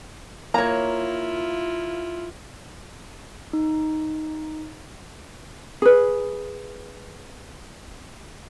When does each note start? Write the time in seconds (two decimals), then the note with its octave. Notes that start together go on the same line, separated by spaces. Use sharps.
0.54 A#3 E4 F4 C#5 A#5
3.53 D#4
5.82 G#4 B4